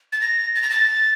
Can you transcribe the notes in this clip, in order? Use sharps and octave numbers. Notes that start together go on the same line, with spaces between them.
A6
A#6
A6
A#6
A6